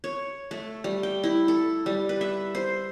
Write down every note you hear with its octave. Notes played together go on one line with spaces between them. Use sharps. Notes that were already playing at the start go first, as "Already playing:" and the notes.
C#5
A3
G3
G5
E4
A4
G3
B4
E5
C5